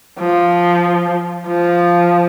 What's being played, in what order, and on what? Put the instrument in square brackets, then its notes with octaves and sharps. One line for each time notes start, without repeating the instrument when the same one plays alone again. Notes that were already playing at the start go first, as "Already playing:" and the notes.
[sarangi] F3
F3